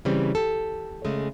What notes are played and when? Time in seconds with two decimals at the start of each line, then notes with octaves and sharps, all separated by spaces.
0.05 C#3 E3 G3 C4
0.35 G4 A4
1.05 C#3 G#3 A3